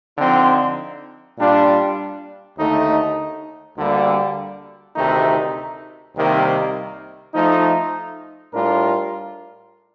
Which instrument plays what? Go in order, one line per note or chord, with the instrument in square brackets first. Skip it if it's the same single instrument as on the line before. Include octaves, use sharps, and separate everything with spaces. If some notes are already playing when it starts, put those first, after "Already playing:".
[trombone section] D3 F3 C4 D#4
A#2 G3 D4 F4
D#2 D3 A3 D#4
D2 D3 G3 A#3
D2 C3 D#3 A3 D#4
C2 C3 D#3 G3 A#3
F3 A3 D#4
A2 G3 D4 F4 A#4